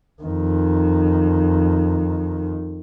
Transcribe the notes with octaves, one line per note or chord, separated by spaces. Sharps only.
F2 D#3